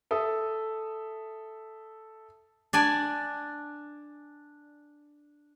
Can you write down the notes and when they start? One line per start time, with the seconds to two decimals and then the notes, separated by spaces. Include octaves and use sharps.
0.11 A4 E5 D#6
2.73 D4 D5 G#5